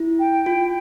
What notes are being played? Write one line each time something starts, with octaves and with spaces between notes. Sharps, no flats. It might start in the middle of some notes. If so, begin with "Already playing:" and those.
Already playing: E4
G5
F4